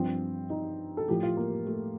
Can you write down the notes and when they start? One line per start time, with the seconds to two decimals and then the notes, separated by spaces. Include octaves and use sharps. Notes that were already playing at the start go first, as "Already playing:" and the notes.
Already playing: G2 F3 C4
0.50 D#4
0.97 A4
1.08 A2 F3 G4
1.23 F4
1.37 A#3
1.66 A3